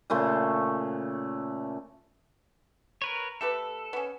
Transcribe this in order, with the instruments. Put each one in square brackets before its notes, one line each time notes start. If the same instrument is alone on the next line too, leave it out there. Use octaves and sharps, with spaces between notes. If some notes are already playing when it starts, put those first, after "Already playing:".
[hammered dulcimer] A#2 C#3 A3 C6
[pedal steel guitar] A#4 B4 C#5
[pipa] A3 G4 B4 [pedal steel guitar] A4
[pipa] B3 C#4